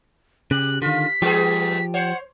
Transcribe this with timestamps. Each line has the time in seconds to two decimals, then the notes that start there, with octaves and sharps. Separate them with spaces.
0.51 C#3 G4 F#6
0.82 D3 D#3 F4 B6
1.22 F3 G3 B3 G4 G#4
1.94 C5 C#5 F#5